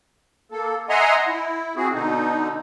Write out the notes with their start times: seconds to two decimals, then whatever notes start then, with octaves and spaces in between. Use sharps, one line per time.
0.52 A#3 A4
0.89 D#5 E5 F#5 G#5 A#5 C6
1.28 E4
1.76 C4 F#4 G#4
1.93 B2 D3 D#4